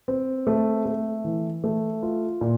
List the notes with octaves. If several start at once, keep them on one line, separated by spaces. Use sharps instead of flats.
C4
A3
A3
E3
A3
F4
A#2